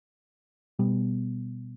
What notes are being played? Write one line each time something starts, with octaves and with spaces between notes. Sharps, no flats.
B2 G3 B3